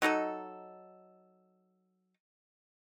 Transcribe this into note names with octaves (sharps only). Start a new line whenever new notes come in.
F#3 D#4 A4 D#5